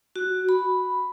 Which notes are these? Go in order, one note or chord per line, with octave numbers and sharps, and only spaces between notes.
F#4
B5